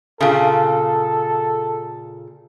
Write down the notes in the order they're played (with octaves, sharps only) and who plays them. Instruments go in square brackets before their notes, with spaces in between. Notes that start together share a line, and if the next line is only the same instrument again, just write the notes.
[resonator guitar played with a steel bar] A#2 C#3 [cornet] A4